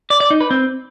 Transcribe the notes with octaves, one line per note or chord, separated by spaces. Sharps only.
D5
D5
D#4
B4
C4